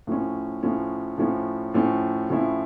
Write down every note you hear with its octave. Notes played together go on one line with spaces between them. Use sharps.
A2 F3 C#4
A2 F3 C#4
A2 F3 C#4
A2 F3 C#4
A2 F3 C#4 E4